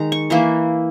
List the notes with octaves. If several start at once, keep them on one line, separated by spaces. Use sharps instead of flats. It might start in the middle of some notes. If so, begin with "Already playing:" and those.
Already playing: D#3 G#3 D#4 A#5
C#6
E3 A#3 E4 A#5